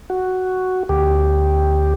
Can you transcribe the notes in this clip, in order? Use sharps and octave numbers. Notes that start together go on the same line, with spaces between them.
F#4
D2 G4